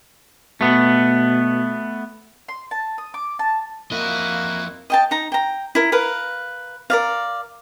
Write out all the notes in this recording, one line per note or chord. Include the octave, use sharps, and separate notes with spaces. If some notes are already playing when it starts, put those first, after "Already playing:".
B2 A3 B3
C6
A5
D#6
D6
A5
F2 A#3 E4 F#4 D#5
D#5 G5 A5
D#4 A#5
G5 A#5
E4 A#4
A#4 B4 F5
A#4 D5 F5